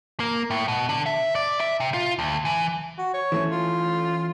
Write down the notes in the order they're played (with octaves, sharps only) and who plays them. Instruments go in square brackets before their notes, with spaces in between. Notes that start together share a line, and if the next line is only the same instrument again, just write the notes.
[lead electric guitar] A#3
A2
B2
D3
E5
D5
E5
C3
F4
D2
E3
[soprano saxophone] F#4
C#5
[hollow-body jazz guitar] E3 A3 C#4
[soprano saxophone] F4